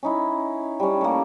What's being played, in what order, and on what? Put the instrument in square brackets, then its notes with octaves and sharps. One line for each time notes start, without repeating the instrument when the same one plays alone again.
[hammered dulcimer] C#4 D#4 E4
G3 C#4
A3 A#3